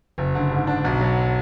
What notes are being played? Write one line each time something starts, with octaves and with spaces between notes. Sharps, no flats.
F#1
D3
G#2
D4
B1
F#3